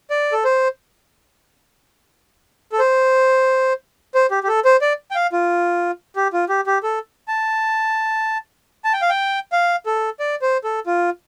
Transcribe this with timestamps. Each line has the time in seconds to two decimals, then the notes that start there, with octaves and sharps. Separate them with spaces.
0.10 D5
0.32 A4
0.44 C5
2.72 A4
2.79 C5
4.15 C5
4.31 G4
4.43 G4
4.48 A4
4.65 C5
4.81 D5
5.11 G5
5.15 F5
5.32 F4
6.16 G4
6.33 F4
6.49 G4
6.67 G4
6.83 A4
7.28 A5
8.85 A5
8.93 G5
9.02 F5
9.09 G5
9.52 F5
9.86 A4
10.20 D5
10.42 C5
10.64 A4
10.86 F4